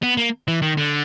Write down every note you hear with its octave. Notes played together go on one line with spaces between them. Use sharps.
B3
A#3
E3
D#3
D3